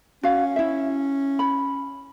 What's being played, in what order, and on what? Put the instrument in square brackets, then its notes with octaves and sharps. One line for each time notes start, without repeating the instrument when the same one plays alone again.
[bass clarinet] C#4 [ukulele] F#4 F5
[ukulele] E4 E5
B5